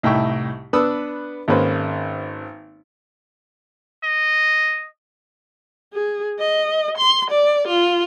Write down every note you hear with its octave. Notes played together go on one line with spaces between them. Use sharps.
C2 A2 D#4 E5 G5 C#6
B3 D4 B4 D#6 E6
G#1 G#3 A#3 C#4 B4 C5
D#5
G#4
D#5
C6
D5
F4